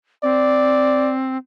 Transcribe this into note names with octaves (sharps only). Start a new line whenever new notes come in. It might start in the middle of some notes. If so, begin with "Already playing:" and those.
C4 D5